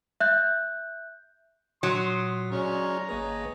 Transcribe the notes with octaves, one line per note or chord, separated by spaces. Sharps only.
E5 F#6 G6
A#2 F#3 C6 D#6
G#3 C#4 F#4 C#5 D5 A#5 F6
G#1 A#3 G#4 B4 C#5 D#5